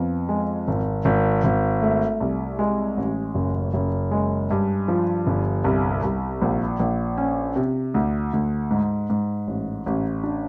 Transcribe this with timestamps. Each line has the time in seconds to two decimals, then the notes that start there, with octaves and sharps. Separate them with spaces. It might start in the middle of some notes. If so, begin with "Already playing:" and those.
Already playing: F2 B3
0.29 G#3
0.68 G#1
1.05 G#1
1.44 G#1
1.82 A3
2.20 C2
2.59 G#3
2.97 A1
3.35 F#1
3.74 F#1
4.11 G#3
4.51 G2
4.88 F3
5.27 G1
5.64 C2
6.03 C2
6.42 A#1
6.79 A#1
7.18 C#4
7.56 C3
7.94 D2
8.33 D2
8.71 G#2
9.10 G#2
9.47 A1
9.86 A1
10.24 D4